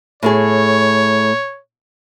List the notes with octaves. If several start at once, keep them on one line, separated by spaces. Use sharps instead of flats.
A2 A3 G#4 C#5